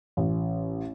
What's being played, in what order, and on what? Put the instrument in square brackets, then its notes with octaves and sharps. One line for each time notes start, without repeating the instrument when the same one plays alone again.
[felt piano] A1